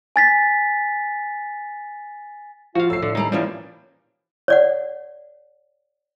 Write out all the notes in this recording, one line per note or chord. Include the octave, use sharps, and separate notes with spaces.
G#5 A6 B6
F3 F4 F#4 F5
A2 F3 E6 C7
A2 D3
D#2 G3 D#4 A#5
A#2 E3 F3 G3 A#3 C#4 D4
C#5 D5 F#5